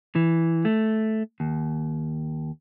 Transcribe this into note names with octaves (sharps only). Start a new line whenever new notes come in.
E3
A3
D#2